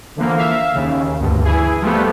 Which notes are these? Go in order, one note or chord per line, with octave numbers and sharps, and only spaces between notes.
D3 E3 F3 A#3
E5 F5
D#2 C#3
D2 G2
E3 E4 G#4
F3 G3 A3 B3